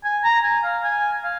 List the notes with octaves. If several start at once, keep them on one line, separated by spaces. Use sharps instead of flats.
G#5
A#5
G#5
F5
G#5
F5